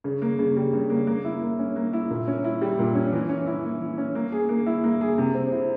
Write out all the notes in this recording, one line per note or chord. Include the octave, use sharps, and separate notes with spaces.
C#3
A#3
C#3
G3
C#3
A#3
A#3
E4
A#3
C#4
A#3
E4
A#2
C#4
E4
G3
A#2
C#4
E3
C#4
E4
A#3
E3
C#4
A#3
G#4
A#3
E4
A#3
G#4
C3
C4
E4